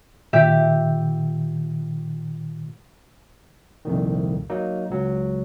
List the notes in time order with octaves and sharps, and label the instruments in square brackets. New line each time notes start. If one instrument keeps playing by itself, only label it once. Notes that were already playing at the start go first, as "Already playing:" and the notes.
[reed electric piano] A#2 D#3 F4 [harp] G4 E5
[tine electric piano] C2 F2 A#2 D#3
F#3 A#3 D#4
C#2 F#3